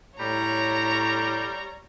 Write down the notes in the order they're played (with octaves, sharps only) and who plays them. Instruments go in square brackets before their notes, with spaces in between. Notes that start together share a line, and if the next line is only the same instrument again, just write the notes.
[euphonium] A2 [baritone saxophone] G3 [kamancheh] C#5 A#5